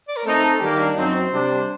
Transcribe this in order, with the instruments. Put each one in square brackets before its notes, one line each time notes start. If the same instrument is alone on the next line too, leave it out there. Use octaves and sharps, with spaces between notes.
[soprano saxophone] D5
A#4
[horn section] A3 C4 D#4 [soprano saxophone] A4
[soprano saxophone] A4
[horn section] D#3 G3 A#3 [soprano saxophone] G4
[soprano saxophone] D4
[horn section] F#2 F#3 C4 [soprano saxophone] D#4
[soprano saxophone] C5
[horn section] C3 G3 D4